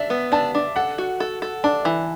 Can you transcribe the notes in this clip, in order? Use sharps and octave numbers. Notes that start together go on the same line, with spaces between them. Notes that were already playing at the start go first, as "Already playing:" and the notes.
Already playing: D4 E5
B3
D4 A5
D4
A4 F#5
F#4
A4
A4
D4 A5
E3